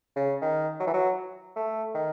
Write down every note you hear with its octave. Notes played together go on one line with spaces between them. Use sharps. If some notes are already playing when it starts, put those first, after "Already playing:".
C#3
D#3
F#3
E3
F#3
A3
D#3